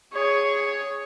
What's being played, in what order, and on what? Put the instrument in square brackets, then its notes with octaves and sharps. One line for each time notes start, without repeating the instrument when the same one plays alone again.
[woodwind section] G#4 [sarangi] C#5